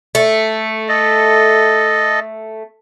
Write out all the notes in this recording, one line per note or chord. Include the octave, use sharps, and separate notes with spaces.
A3
A4 D#5